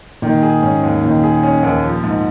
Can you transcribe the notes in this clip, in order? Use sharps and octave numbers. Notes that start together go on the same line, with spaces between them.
A#2 D#3
G#4
G#2 C#4
D#2
A#2 D#3
G#4
C#4
D#2
F3
G#2